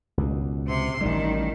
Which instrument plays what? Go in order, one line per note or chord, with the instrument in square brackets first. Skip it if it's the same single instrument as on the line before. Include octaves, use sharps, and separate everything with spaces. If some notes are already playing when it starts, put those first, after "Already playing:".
[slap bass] C#2 B2
[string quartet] C3 C6
[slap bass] A1 G3 [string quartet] D#3